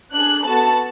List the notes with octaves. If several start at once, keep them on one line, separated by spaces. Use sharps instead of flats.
D4 G#4 F#6
B3 F#4 A4 A5